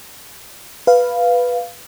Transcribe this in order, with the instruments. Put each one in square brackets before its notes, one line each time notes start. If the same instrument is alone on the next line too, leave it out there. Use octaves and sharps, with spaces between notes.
[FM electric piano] B4 F5